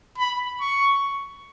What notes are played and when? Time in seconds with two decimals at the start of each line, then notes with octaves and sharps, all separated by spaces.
0.18 B5
0.60 C#6